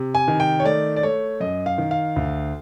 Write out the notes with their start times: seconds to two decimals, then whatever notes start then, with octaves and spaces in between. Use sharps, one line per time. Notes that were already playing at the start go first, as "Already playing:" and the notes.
Already playing: C3
0.15 G#5
0.28 D#3
0.40 G5
0.60 C#5
0.65 A3 D5
0.96 D5
1.03 A3 C#5
1.40 F#2 D#5
1.66 F5
1.78 D#3
1.91 F5
2.16 D2